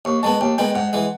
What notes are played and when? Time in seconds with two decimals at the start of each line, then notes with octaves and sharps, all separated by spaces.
0.05 D#2 C#6
0.23 D#3 G#3 B3 A5
0.41 D#2 G5
0.58 D#3 G#3 B3 G5
0.75 G#2 F#5
0.93 E3 G#3